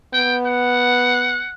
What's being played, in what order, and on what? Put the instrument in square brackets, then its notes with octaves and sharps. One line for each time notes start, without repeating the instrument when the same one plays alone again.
[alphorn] B3 [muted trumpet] G5
[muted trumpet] F#5